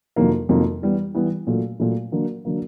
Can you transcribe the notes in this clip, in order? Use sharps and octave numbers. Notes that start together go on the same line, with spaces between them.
F2 C3 D#3 F#3 A#3
F2 C3 D#3 F#3 A#3
E3 G3 B3
E3 G3 B3
A#2 F#3 A3
A#2 F#3 A3
D3 F#3 A#3
D3 F#3 A#3